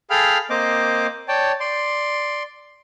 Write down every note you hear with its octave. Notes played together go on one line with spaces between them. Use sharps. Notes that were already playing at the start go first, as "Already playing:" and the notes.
G#4 A4 F5 G5 B5 F6
A#3 C4 C5 D#5 D6
C#5 D5 G5 A5
D5 C6